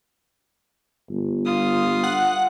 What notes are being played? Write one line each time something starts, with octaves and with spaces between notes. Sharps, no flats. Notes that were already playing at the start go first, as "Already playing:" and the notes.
G1
F4 D#6
F#5